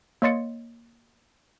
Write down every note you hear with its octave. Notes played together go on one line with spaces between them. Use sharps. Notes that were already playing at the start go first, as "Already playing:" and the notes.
A#3 C#5 D#5 C6 A6 C#7